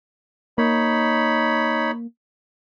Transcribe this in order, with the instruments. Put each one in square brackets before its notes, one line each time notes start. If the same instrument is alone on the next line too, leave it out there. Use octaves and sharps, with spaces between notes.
[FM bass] A#3 [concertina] D#4 C#5 B5